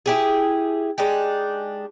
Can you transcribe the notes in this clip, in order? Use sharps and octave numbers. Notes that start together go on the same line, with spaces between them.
E4 G4 G#4
G#3 D4 D#4 G4